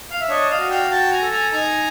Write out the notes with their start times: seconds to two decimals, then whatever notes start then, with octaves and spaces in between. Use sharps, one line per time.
0.11 F5
0.20 E5
0.29 D4 C#5 D#5
0.50 D#5 F5
0.60 F#4
0.70 F5 G5
0.91 F#4 G5 A5
1.11 G#5 A#5
1.22 A4
1.31 G#5 A#5
1.52 D#4 G#5 A#5